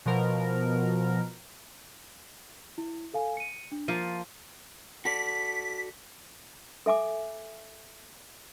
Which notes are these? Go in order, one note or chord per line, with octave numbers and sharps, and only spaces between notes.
B2 F3 A#4
E4
A4 F5 G#5
C#7 D#7
D4
F3 A#3 F4 D#7
F#4 A4 D5 B6
A4 E5 G#5 D6